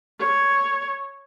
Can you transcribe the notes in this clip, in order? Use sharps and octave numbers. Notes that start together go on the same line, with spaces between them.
C#5